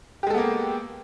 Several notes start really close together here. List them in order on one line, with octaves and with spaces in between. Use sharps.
G4 G#3 A4 B3 A#3